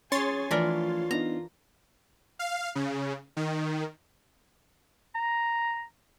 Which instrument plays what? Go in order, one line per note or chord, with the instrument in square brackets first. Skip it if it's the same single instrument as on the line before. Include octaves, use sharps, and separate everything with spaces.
[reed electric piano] C#4 [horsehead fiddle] G#4 G#5 [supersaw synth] C#5 C6 A6
[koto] E3 D4 A#4 [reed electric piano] F3 A3 [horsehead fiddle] F4
[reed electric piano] B3 D4 D#4 [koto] A#5
[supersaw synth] F5
C#3
D#3
[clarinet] A#5